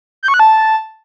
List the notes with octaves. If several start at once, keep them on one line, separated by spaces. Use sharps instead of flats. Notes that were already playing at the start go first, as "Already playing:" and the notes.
G6
C#6
F#6
A5